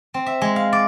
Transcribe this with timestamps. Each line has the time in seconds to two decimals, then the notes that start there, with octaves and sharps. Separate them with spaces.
0.14 C4
0.26 E5
0.42 G#3
0.56 F5
0.73 D5